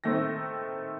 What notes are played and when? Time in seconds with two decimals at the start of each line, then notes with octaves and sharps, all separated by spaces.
0.04 D#3 A3 C4 A#6